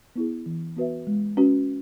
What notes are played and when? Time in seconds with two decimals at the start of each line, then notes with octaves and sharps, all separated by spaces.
0.16 B3 E4 G#4
0.46 E3
0.76 B3 F#4 B4 E5
1.07 G#3
1.37 C#4 F#4 B4